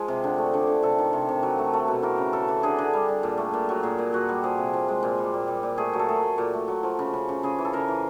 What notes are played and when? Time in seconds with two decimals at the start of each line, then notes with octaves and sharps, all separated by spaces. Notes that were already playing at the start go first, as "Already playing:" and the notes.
Already playing: F3 G#3 G#4
0.08 C3
0.24 D3
0.38 A3
0.54 D3
0.68 D3
0.83 C3 A4
0.98 D#3
1.13 C3
1.29 C3
1.43 F#3
1.58 A3
1.73 A3
1.88 B2
2.03 E3 A#4
2.18 C#3
2.33 C#3 A4
2.48 E3
2.63 D3 G#4
2.79 D3
2.93 G3
3.08 G3
3.23 A#2
3.38 A3
3.54 A#2
3.69 F#3
3.83 A#2 G#4
3.99 A#2
4.13 A#2 F#4
4.29 G3
4.43 F3 G#4
4.58 C3
4.73 F3
4.88 G#3
5.03 A#2
5.18 G3
5.34 A#2
5.48 G3
5.63 A#2
5.78 A3 G#4
5.93 F#3
5.99 A4
6.09 A3 G#4
6.23 A3
6.38 A#2
6.53 A3
6.68 F#3
6.83 F3
6.99 C#3
7.13 C#3
7.29 C#3
7.43 C#3 G#4
7.59 E3
7.65 A4
7.73 C#3 A#4
7.88 E3